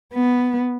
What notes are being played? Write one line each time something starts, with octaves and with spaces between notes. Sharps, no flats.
B3